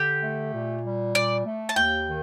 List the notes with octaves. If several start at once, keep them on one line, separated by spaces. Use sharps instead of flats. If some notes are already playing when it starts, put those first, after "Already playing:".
Already playing: D3 G4
A3
A#2
G3
A#2 D5
A3
A5
D#2 G5
D#3